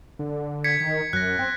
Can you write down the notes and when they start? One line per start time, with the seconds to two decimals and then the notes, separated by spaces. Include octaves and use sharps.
0.19 D3
0.64 G#6 B6 C#7
0.80 D#3 B6
1.13 F#2 F#6 A#6
1.39 C4